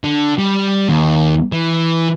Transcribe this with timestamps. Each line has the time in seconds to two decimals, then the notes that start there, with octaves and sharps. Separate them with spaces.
0.04 D3
0.38 G3
0.89 D#2
1.52 E3